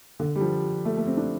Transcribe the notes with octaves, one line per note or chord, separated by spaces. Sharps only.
D3
G3
F3
A3
A3
C4
D4